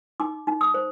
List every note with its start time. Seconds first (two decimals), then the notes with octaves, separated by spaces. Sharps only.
0.20 D#4 D6
0.47 D#4
0.61 D#6
0.74 C5